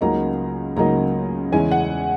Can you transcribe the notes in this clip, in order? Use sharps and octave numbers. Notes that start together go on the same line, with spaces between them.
C#2 C#3 F#3 A#3 D#4 A#5
C#2 C#3 F#3 A#3 D#4 A#5
E2 C#3 G#3 C#4 E4 G#5
F#5